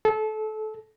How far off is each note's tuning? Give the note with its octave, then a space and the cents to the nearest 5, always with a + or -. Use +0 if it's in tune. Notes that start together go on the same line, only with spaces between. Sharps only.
A4 -25